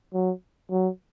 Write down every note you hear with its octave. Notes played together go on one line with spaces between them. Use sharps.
F#3
F#3